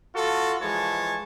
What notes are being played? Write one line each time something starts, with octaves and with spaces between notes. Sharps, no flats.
F4 F#4 A4
E3 F3 G#3 C#5 A5